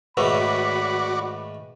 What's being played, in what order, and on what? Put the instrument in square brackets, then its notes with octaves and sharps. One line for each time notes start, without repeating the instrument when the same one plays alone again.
[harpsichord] G#2 D#3 A3 [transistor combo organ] F#4 D5 [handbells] B4 [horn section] C#5 B5